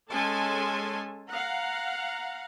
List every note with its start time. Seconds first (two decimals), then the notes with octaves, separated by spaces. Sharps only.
0.11 G#3 C#4 A4 G#5 A5 C6
1.31 F5 F#5 A#5